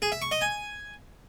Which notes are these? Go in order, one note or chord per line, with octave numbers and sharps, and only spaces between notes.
G#4
E5
C#6
D#5
G#5